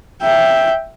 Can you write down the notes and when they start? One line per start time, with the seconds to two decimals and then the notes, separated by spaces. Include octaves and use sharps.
0.22 E5 G5